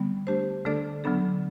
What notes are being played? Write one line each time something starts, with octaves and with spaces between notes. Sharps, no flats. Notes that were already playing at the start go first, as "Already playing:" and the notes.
Already playing: D3 G3 B3
A3 D4 G4 C5
D3 A3 D4 A4 D5
D3 F#3 B3 D4 A4